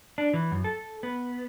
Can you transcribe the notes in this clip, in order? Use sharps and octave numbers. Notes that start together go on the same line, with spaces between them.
D4
E3
F#2
A4
B3